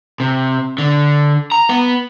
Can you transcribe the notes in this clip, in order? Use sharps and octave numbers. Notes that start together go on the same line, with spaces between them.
C3
D3
A#5
B3